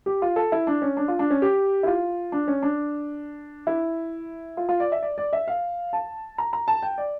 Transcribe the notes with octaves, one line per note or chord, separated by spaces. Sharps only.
G4
F4
A4
E4
D4
C#4
D4
F4
D4
C#4
G4
E4
F4
D4
C#4
D4
E4
F4
F4
D5
E5
D5
D5
E5
F5
A5
A#5
A#5
A5
G5
D5